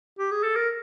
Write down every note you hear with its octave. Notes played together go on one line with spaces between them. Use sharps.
G4
G#4
A4
A#4